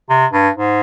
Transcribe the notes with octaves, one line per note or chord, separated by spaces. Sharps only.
C3
G2
G#2